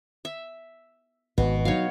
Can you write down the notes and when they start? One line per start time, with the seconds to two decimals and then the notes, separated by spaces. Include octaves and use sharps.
0.25 E5
1.38 G#1 B2 B4
1.65 F#3 D#4 C#5 F5